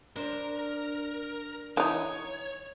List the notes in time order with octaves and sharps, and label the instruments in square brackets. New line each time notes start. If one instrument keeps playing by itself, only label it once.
[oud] D4 C5 [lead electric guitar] A#4
[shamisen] E3 D#4 [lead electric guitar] C#5